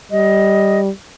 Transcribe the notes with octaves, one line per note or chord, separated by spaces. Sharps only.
G3 D#5